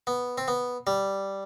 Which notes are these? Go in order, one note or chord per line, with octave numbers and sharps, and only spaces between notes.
B3
C4
B3
G3